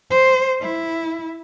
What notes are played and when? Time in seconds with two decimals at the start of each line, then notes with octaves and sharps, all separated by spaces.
0.10 C5
0.62 E4